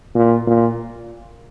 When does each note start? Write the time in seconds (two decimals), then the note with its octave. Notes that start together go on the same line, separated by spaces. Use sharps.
0.15 A#2
0.47 A#2